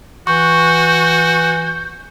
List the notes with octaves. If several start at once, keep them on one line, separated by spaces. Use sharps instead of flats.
E3 F#4 C#6 G6